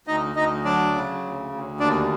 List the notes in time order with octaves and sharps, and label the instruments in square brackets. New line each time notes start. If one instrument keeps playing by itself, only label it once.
[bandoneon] D2 D#4 D#5
D2 D#4 D#5
F#3 D4 D5
C#3
D2
D2
D#2 D4 D5